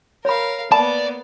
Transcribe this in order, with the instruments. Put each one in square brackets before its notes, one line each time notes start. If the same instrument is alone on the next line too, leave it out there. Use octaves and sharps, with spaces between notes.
[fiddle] A#4 F5 [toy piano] C#5 B5
[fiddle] A#3 B3 [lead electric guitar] D5 [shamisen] A5 [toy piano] B5